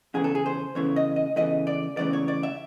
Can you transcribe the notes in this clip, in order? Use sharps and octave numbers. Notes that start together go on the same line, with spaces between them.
E2 C#3 E3 A3 G#4
A4
G#4
C5
E2 C#3 E3 A3 C#5
D#5
D#5
E2 C#3 E3 A3 D#5
D5
E2 C#3 E3 A3 D5
C#5
D5
E5